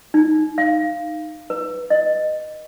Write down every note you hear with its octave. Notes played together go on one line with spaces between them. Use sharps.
D#4
F5
B4
D#5